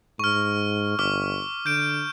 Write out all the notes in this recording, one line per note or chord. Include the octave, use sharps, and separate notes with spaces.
G#2 C#6 F6
G1 D6 F6
D3 G6 D7